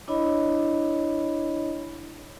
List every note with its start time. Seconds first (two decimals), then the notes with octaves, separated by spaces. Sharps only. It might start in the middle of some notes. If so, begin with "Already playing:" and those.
0.08 D4 E4 C#5 D#5 B5